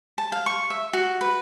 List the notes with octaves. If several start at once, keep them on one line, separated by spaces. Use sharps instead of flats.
A5
F5
C#6
E5
F#4
B4